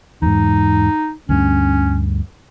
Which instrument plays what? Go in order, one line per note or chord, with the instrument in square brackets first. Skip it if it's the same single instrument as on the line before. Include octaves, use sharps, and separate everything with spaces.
[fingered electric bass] E2 G#2 [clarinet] D#4
[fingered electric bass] D2 G2 D3 [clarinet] C#4